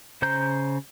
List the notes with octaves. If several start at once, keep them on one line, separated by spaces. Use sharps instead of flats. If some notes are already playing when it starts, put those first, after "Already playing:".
C#3 C5 A#5 G6